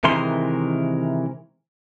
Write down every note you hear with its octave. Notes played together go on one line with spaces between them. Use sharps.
C3 D#3 E3 G#3 A#4 C6